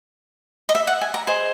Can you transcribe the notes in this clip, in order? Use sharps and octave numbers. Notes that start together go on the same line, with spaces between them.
D#5
E5
F#5
G#5
A#5
G#4 C5 D#5